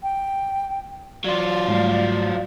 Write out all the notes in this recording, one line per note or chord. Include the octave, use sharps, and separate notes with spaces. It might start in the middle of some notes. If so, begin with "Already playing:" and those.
G5
F#3 F4 D5
G#2 G3 A3